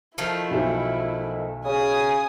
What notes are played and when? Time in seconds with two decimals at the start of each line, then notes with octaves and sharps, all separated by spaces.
0.18 D#3 F3 A3 E4
0.51 B1 E5
1.65 C#3 G#5 D#6